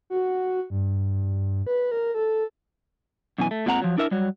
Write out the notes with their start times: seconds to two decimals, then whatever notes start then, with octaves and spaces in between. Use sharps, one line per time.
0.10 F#4
0.70 G2
1.67 B4
1.91 A#4
2.14 A4
3.38 F#2 B2 E3 G#5
3.51 A3
3.66 A#2 G#3 C4 F#5 A5 A#5
3.82 F3 F#3
3.98 D4 E4 A#4 E5
4.11 F#3 G3